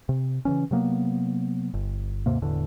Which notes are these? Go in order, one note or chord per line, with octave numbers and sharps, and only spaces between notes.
C3
C#3 E3 C#4
C3 F#3 A#3 B3
G1
D#2 G#2 C3 A#3
E1 E2 A2 D3